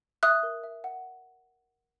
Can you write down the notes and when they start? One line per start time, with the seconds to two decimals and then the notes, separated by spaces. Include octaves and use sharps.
0.23 E5 D#6 F#6
0.43 A#4
0.64 E5
0.84 F#5